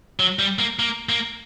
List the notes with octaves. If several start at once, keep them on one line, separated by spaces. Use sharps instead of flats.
F#3
G3
A#3
A#3
A#3